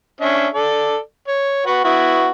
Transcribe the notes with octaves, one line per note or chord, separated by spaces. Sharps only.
C#4 D4 E5
A4 D5
C#5
F#4 B4 F#5
B3 E4 F#4